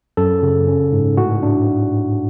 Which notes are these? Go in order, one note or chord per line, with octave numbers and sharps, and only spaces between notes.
F#2 A4
C#3
C#4
G#2
A2 F#4
D4